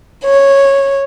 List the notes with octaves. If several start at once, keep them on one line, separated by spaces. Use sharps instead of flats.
C#5